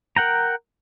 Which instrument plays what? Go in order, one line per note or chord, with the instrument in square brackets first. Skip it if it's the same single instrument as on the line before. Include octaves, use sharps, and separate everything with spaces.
[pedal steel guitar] A#4 F#5 G5 A#5